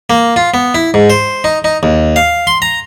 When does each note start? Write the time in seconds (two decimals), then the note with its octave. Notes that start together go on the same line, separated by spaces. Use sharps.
0.10 A#3
0.36 F4
0.54 B3
0.75 E4
0.94 G#2
1.10 C5
1.44 D#4
1.64 D#4
1.83 D#2
2.16 F5
2.47 C6
2.62 A#5